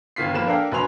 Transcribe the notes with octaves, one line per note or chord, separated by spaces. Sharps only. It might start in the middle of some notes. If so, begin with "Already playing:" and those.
G1 D#3 F4 B6 C7
F3 A#3 B4 E7
A#3 D4 A4 A#4 F5 G5
A#1 F#3 B4 G#5 C6 F7